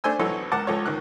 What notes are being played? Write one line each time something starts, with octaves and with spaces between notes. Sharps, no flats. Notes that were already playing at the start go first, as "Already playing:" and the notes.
A3 D4 C5 G#5 E6
B1 E3 F#3 A4 C#5
C#2 A#4 F#5 A5 D6
C#2 F3 A4 C#5
C#2 D#3 F#6